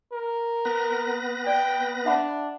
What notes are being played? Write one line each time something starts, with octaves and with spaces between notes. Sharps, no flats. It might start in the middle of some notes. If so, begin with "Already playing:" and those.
A#4
B3 B4 A#6
D5 G5
D4 E5 F#5 B5